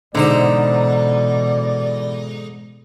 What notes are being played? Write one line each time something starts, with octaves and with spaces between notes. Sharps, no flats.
G#2 B2 D3 E3 D#4 C5 D5